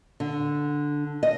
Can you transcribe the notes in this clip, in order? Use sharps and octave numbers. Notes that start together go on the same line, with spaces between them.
D3
D#5